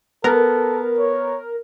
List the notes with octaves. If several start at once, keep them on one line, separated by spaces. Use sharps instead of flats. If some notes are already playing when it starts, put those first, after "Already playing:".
B3 A4 A#4
C#5